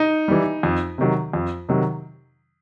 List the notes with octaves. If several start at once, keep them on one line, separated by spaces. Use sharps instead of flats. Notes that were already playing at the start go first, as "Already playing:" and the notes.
Already playing: D#4
E3 G3
F2
C3 D#3 F#3
F2
C3 D#3 F#3